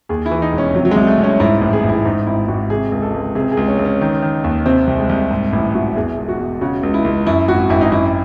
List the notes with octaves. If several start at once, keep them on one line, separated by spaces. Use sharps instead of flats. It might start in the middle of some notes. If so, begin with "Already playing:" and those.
D#2 G#4
E4
E3
D#4
E1
C#4
C3 F#3
F#3
C2 G#3
A3
C2
C#4
G#2 E4
A1
G#4
A1 E4
G#2 D#4
G#1 E4
G#1 F#4
C3 G#4
C#2
A4
C#2
C3 G#4
G#4
C#2
C#4
C#2
C#4
D#3
D#3
D#2
C3 C4
C2
G#3
C2
G#2
A1 E4
A1 F#4
E2 G#4
E1
F#4
E1
C#3 F#4
C#2
E4
C#2
F#2 E4
G#1 F#4
G#1 E4
D#4
F#2 E4